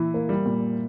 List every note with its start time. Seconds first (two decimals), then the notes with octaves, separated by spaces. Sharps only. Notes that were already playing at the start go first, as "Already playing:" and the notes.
Already playing: A#2 E3 E4
0.14 A#3
0.29 G3
0.46 A#2